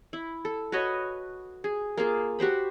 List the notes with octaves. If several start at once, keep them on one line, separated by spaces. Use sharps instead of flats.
E4
A4
F#4 B4 C#5 D#5
G#4
A#3 F4 G#4
F#4 G4 C5 B5